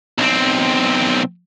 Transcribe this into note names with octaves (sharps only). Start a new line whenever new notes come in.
B1 C4